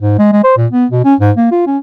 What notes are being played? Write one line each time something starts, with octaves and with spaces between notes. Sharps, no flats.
G#2
G#3
G#3
C5
A#2
B3
B2
C#4
G#2
A#3
F4
C#4